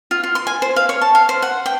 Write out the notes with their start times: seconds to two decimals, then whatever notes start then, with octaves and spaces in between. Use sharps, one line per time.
0.11 F4
0.23 F4
0.35 C6
0.47 G#5
0.62 C5
0.76 F5
0.89 C#5
1.01 A5
1.15 F5
1.29 C5
1.42 F#5
1.66 G5